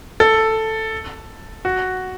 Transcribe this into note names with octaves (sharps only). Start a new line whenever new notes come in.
A4
F#4